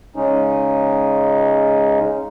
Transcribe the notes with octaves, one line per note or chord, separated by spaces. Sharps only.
C#3 G#3 C#4 D#4